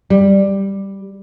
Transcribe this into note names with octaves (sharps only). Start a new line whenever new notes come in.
G3